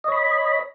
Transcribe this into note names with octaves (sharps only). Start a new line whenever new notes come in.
C#5 D#5 B5